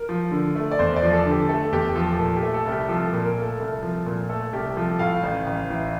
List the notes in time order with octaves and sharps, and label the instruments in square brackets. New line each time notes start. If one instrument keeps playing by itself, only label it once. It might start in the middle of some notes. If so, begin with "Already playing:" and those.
Already playing: [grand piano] A#4
F3
D3
A3
D5
E2 C5
D5
F3
A4
D3
G4
A3 A4
E2 G4
F3 A4
A#2 A4
G4
A3
A4
C2
G4
F3 A4
A#2
A#4
A3
A4
C2
F3
A#2
A3 A4
C2 G4
F3 A4
A2 F5
A1
A1
E3